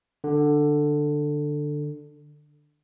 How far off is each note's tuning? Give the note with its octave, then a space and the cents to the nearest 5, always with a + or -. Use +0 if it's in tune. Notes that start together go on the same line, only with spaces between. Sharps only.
D3 +10